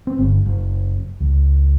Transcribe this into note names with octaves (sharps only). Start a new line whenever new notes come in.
C4
G1
F#1
C#2